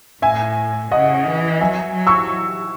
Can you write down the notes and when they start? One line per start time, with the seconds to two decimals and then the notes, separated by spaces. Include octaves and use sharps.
0.22 A2 E5 G#5
0.91 C#3 D#5 F#5
1.26 E3
1.61 F#3 E5 G#5
1.95 F#3
2.07 C#6 E6